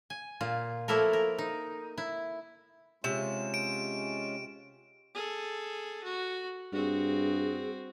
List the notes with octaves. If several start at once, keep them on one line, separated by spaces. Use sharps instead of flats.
G#5
A#2 F4
F3 A3 A#3 E4 A4 A#4
A#4
D#4
E4
C3 G#3 C#4 F4 E7
D7
G#4 A4
F#4
G2 C4 F#4 G#4